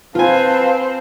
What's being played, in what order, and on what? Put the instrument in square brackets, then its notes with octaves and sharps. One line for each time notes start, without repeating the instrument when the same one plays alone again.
[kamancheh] C4 C5 [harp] F4 G#5 [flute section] B4 F5 A5